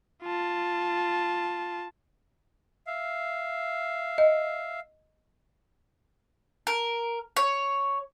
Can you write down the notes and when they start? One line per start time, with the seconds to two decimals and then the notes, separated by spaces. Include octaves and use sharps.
0.23 F4 A5
2.87 E5 F5
4.18 D#5
6.67 A#4
7.37 C#5